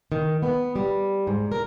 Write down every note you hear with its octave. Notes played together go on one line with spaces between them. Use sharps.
D#3
B3
G3
G#2
A#4